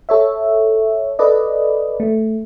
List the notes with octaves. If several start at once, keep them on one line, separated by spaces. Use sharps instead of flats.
A4 C#5 E5
A4 B4 D5 D#5
A3